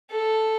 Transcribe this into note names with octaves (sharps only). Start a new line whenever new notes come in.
A4